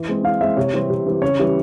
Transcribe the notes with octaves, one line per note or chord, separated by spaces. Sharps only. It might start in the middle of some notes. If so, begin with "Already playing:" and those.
Already playing: E3
G#3 C4
E3 F5
G#3 C4 E5
C3 C#5
E3 G3 C4
C3
E3 G3 C4
C#3 C#5
E3 G3